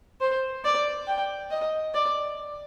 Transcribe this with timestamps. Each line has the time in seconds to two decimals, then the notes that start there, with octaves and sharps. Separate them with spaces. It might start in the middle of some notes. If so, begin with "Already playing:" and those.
0.21 C5
0.64 D5
1.07 G5
1.51 D#5
1.94 D5